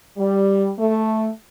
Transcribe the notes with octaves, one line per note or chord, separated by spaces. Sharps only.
G3
A3